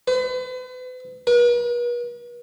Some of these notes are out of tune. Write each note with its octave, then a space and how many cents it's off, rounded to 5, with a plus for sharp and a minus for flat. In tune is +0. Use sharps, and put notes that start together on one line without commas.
B4 +40
B4 -45